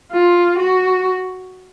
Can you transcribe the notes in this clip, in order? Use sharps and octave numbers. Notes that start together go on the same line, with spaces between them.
F4
F#4